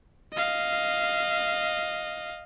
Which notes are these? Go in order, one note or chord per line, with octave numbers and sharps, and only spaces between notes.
D#5 F5